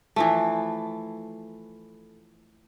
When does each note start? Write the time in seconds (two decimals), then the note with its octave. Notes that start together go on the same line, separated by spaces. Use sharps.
0.16 E3 F3 A3